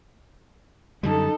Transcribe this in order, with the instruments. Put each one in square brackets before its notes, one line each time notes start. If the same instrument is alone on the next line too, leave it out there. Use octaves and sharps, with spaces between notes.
[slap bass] F#2 D3 G3 [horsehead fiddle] D#4 A4